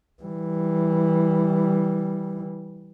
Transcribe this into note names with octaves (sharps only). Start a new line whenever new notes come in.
E3 G3